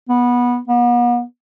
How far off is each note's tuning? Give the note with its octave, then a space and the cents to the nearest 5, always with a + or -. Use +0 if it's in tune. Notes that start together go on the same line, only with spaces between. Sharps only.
B3 -15
B3 -40